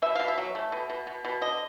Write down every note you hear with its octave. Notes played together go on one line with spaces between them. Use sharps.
B2 E5
B2 F5
E5
F#3
A3
B2
B2
B2
B2
D3 D#5